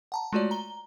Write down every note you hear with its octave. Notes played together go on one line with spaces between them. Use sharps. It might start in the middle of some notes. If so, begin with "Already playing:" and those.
F#5 A5 A#5
G#3 A3 F4 F#4 C#5 D5
A#5 G7